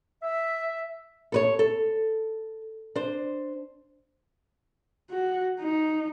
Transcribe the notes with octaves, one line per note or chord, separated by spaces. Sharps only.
E5
A4 B4 C#5
A4
D4 C5
F#4
D#4